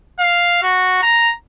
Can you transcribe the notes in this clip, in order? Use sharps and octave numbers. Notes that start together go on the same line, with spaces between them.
F5
F#4
A#5